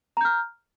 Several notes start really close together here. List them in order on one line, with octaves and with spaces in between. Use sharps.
A#5 G6 F6